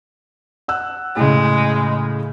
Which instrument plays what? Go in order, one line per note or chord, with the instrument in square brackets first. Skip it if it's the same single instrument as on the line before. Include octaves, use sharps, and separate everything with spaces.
[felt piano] F#5 E6 F#6
[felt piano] A2 C#3 [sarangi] G#3